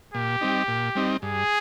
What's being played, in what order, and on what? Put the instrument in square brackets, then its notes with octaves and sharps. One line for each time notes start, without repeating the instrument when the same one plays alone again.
[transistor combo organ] A#2 [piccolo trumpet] G4
[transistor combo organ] G3 C4 D#4
A#2
G3 C4 D#4
[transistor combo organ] G2 [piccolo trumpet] G#4